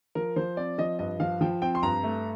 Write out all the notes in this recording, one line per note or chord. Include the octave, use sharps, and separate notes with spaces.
F3 A#4
F3 C5
C4 D5
F3 D#5
G2 D#5
F3 F5
F3 G5
C4 G5
C6
G2 A#5
A3